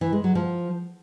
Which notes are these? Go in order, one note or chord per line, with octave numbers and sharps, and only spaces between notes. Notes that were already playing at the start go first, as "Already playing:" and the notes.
E3
G#3
F#3
F3